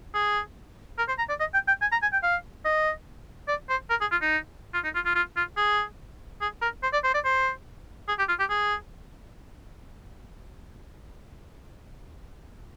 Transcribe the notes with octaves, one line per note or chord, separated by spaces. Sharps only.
G#4
A#4
C5
A#5
D5
D#5
G5
G5
G#5
A#5
G#5
G5
F5
D#5
D5
C5
A#4
G#4
F4
D#4
F4
D#4
F4
F4
F4
F4
G#4
G#4
A#4
C5
D5
C5
D5
C5
G#4
G4
F4
G4
G#4